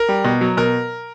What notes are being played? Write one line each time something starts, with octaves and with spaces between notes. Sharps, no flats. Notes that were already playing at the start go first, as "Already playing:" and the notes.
Already playing: A#4
G3
B2
F#3
B2 A#4